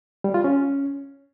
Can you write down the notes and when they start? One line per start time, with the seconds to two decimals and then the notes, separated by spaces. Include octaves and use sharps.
0.24 G3
0.34 F4
0.44 C#4